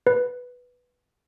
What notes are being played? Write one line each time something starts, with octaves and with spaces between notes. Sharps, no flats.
B4